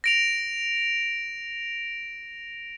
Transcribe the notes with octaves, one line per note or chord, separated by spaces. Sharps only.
A#6 D7 F7